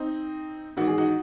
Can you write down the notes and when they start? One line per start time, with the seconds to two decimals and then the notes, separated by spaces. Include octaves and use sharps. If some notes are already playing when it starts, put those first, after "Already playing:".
Already playing: C4 D#4
0.77 A1 G#2 D#3 F#4
0.88 G#4
0.98 D#4 F#4